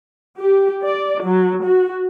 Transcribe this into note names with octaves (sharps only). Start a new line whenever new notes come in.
G4
D5
F#3
F#4